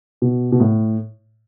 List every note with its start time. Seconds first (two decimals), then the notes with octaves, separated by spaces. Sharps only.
0.22 B2
0.52 B2
0.60 A2